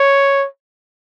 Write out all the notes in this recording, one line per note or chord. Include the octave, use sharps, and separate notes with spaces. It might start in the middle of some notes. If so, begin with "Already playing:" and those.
Already playing: C#5